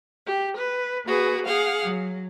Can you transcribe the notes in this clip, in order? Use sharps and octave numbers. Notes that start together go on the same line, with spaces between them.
G4
B4
A#3 F#4 G#4 B4
G#4 F5 F#5
F#3